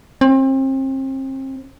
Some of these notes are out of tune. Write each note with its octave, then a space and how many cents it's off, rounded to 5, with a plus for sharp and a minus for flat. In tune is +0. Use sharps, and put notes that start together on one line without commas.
C4 +35